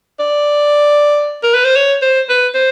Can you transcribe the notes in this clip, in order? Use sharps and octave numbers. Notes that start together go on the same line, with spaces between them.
D5
A#4
B4
C5
C#5
C5
B4
C5